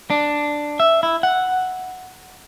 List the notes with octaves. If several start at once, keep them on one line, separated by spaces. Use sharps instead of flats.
D4
E5
E4
F#5